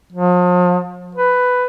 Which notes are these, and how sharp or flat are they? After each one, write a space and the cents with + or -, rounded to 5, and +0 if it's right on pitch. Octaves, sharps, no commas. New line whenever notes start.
F3 +40
B4 +10